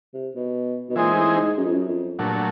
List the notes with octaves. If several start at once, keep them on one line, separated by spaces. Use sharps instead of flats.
C3
B2
B2
A#2 E3 G#3 C4 D#4 G#4
A2
G#2
F#2
F2
F#2
F2
G2 A#2 F#3 A3